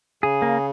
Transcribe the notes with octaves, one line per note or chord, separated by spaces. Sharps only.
C#3 G#4
A#3